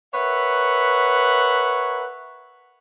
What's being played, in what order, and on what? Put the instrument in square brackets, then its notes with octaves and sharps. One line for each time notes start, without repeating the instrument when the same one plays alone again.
[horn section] A#4 B4 C#5 E5 F#5